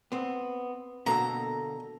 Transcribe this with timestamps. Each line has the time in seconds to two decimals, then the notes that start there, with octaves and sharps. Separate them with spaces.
0.12 B3 C4
1.06 B2 D3 A#3 F#4 A4 A#5